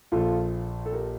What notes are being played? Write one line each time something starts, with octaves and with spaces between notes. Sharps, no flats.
A#1 A#2 F3 F4 A4
A4
G4 A#4